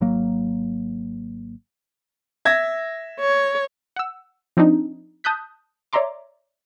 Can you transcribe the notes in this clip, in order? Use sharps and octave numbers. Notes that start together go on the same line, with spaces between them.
G#1 F#3 A#3
E5 G#6 A#6
C#5
F#5 E6
F3 C4 D4 D#4
A5 D#6 F#6 G6 B6
C#5 D5 E5 A#5 C6 D6